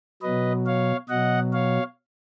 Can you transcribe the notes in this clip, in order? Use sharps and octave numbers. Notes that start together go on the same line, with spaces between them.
B2 F#3 B4 D#5
C#5 F5
B2 F#3 D#5 F#5
C#5 F5